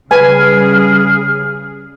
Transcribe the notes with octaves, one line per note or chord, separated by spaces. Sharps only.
C#3 G3 G#4 B4 G#5 F6